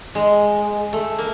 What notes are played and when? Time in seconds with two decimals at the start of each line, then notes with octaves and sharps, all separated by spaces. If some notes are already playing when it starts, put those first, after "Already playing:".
0.15 G#3
0.93 A3
1.18 A#3